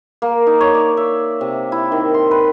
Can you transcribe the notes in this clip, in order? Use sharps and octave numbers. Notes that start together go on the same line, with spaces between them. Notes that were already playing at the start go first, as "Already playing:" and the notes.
A#3
D#4
C#5
D5
E5
C3
E4
D#3
C6
B4